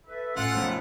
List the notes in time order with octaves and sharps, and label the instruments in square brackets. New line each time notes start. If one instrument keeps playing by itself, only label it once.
[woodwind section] A4 B4 E5
[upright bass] A2 [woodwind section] C#4 A4 [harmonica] F4 F#5
[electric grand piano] B1 F#2 F3 [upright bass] A3